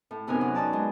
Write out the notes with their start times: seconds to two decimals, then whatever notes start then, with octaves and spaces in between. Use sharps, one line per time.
0.11 A2
0.27 F#2 C3 B3 D#4 A#4 G#5
0.41 F#3
0.55 B2 D#4 D5 A5
0.73 G#3